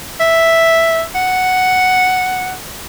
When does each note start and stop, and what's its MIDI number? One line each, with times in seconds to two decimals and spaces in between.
0.20 1.03 76
1.15 2.53 78